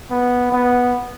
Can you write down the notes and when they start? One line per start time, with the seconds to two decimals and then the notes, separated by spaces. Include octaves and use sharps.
0.10 B3
0.52 B3